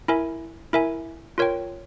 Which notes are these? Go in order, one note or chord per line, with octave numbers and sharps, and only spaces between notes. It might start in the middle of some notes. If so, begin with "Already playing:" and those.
E4 A#4 E5 G#5
E4 A#4 E5 G#5
F4 A#4 C#5 G5